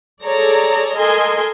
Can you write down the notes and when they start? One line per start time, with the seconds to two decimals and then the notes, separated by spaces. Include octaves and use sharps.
0.24 G#4 A4 C#5 D5 A#5
0.97 A4 A#4 D#5 G#5 C6